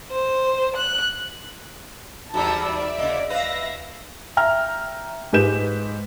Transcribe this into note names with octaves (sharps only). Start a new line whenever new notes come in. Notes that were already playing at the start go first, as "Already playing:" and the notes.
C5
F#6
D#2 G#2 E3 G3 F#4 A5 A#5 E6
D5 E5
C#3 A#3 D#5
B4 E5 F5 A#6
E5 G5 A#5 F6
G#2 G#3 G4 B4 G6 E7